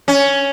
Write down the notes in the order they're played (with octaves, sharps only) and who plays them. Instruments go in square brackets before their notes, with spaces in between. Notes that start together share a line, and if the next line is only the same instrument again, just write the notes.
[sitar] C#4